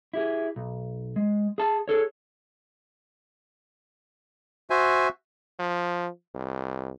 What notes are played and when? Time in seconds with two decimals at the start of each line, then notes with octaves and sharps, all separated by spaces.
0.14 E4 G4 G#4
0.56 B1
1.16 G#3
1.58 G#4 A5
1.88 G#4 A4 C#5
4.70 F#4 C5 E5 G#5
5.59 F3
6.34 C2